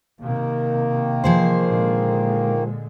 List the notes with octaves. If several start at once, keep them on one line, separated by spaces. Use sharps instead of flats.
C3 D#3 A#3
F3 G#4 C5
A#2 D3 G#3